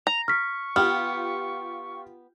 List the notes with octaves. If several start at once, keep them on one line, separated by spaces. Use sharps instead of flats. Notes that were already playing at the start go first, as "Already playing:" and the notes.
A#5 F7
C#6 F6 B6
B3 F4 G4 G5 F6